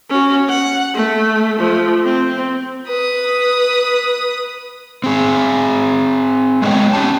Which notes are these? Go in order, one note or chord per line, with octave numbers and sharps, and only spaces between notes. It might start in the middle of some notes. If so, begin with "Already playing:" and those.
C#4 F#4
F#5
A3
F3 A3
C4
B4 D#6
C4 G#4
G#3 B3 D#4 A4 C#5 G5
C#4 G4 A5